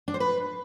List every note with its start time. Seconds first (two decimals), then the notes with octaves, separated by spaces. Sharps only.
0.08 D4
0.14 C5
0.20 B4